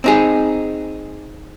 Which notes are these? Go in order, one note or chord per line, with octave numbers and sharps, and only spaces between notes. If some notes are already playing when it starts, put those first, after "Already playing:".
C4 D#4 G#4